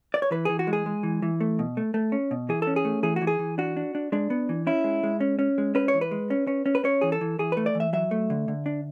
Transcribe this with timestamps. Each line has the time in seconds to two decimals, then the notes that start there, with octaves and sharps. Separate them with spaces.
0.14 D5
0.22 C#5
0.31 E3 B4
0.45 E3 G#4
0.59 F#4
0.67 G#3
0.73 G#4
0.86 G#3
1.03 E3
1.22 E3
1.41 A3
1.59 B2
1.77 A3
1.94 A3
2.12 C#4
2.31 B2
2.49 E3 G#4
2.62 C#4 A4
2.76 G#4
2.85 A3
3.03 E3 G#4
3.16 F#4
3.22 E3
3.27 G#4
3.39 E3
3.58 D4 F#4
3.77 D4
3.95 D4
4.12 G#3 D4
4.30 B3
4.49 E3
4.67 C#4 E4
4.84 G#3
5.03 G#3
5.20 C#4
5.39 C#4
5.58 G#3
5.75 C#4 B4
5.88 C#5
5.94 E3
6.01 B4
6.11 G#3
6.30 C#4
6.47 C#4
6.66 C#4
6.75 B4
6.84 C#4 C#5
7.01 E3 G#4
7.12 A4
7.21 E3
7.39 E3 G#4
7.52 A3 B4
7.66 D5
7.75 E3
7.80 E5
7.93 F#3 E5
8.11 A3
8.30 D3
8.48 D3
8.66 D4